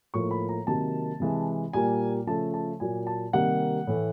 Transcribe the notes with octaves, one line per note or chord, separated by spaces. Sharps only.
A2 F3 A#3 C#6
B5
A#5
C3 D#3 F#3 A#3 A5
C3 E3 G#3
A#2 G3 A#3 G#5
C#3 F3 A3 A5
A5
A#2 F#3 A#3 G#5
A5
C3 D#3 G3 A#3 F#5
A2 E3 A3